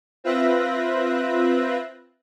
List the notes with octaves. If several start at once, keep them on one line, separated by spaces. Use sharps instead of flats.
C4 F4 B4 E5 F#6 A#6